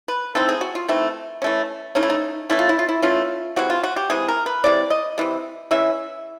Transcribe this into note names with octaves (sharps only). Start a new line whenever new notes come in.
B4
E3 A3 C4 D#4 A4
G#4
F#4
F4
E3 A3 C4 D#4
E3 A3 C#4
E3 A3 C#4 D#4
E4
D#4
E3 A3 C#4 E4
F4
E4
F4
E4
E3 A3 C#4 F4
C3 E3 G#3 F#4
F4
F#4
G4
C3 E3 G#3 G#4
A#4
B4
C3 E3 G#3 D5
D#5
C3 E3 G#3
E3 G#3 C#4 E5